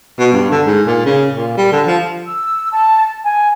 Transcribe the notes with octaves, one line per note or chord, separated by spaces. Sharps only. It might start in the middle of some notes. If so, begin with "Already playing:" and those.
B2
G2
D3
G#2
A#2
C#3
A#2
G3
D3
F3
E6
A5
G#5